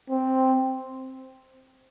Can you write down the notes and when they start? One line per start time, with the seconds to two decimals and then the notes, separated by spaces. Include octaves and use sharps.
0.10 C4